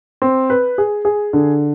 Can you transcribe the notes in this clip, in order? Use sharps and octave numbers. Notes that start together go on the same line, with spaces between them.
C4
B4
G#4
G#4
D3